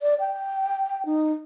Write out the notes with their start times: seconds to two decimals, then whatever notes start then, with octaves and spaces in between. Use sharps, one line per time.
0.01 D5
0.20 G5
1.06 D#4